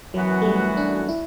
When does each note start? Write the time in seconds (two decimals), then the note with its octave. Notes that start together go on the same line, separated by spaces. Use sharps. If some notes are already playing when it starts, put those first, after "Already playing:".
0.14 F#2 E3 F#3 B3 F#4
0.42 A3
0.46 G3
0.77 D4
1.09 E4